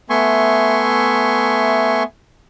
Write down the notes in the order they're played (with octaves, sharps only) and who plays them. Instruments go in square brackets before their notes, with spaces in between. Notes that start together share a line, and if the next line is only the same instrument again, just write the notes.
[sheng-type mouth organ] A3 B3 E5 G#5 C6 C#6